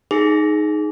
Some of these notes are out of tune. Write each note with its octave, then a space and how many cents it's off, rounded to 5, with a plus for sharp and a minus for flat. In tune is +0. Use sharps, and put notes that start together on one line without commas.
D#4 +0 G#4 +20